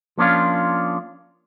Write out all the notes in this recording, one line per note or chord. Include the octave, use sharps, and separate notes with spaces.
F3 A#3 C#4 D4 F4